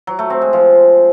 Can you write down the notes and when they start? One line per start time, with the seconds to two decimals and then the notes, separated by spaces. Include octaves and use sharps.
0.07 F#3
0.19 A3
0.30 C4
0.42 G#3
0.53 F3